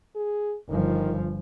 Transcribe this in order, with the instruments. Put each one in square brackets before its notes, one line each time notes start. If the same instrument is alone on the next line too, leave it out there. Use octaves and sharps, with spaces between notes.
[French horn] G#4
[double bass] G1 F3 [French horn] D#3